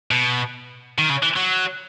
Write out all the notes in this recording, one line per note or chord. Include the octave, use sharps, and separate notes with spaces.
B2
D#3
C#3
E3
F#3